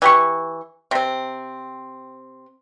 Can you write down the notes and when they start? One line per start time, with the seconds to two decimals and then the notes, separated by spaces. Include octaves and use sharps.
0.02 E3 G4 C#6
0.91 C3 C4